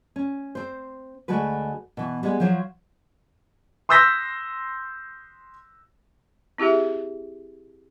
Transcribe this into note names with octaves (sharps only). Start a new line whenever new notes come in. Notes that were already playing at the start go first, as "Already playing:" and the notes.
C#4
C4 C5
D2 G#3 A3 F#4 B4
B2 E3
G3 G#3 B3 G#4
F3 F#3 C5 C#5 F5
C6 D#6 E6 G6 A#6 B6
C4 E4 G4 G#4 E5